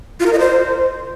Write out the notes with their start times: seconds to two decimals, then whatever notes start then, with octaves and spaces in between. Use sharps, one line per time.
0.20 F4
0.26 A#4
0.33 D#5
0.39 C5